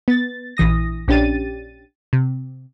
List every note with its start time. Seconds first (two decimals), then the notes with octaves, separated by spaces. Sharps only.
0.08 B3 A6
0.57 A#1 E3 D#6 A#6
1.08 A#1 C#4 D4 G4 A6 D#7
2.13 C3